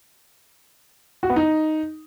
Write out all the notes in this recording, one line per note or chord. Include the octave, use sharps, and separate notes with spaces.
F#4
B3
D#4